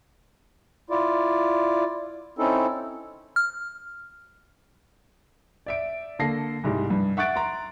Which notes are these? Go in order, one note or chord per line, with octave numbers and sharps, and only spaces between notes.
E4 F4 D5
C4 C#4 D#4 E4 A4
F6
D5 E5 D7
D3 A#3 A4 A#6 C7
C2 G#2 G3
G2
E5 F#5 C#6 F#6 A6 D7
A#5 C6